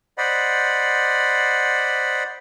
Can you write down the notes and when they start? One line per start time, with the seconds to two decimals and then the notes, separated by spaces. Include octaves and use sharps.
0.18 C5 D5 D#5 F#5 B5